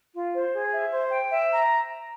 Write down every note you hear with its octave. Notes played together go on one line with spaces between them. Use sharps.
F4
C5
G#4
E5
C5
G5
E5
A#5